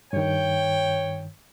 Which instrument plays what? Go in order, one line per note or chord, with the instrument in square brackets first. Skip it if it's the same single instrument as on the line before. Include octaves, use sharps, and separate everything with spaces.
[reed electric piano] G2 D#3 [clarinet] C#5 [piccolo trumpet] G5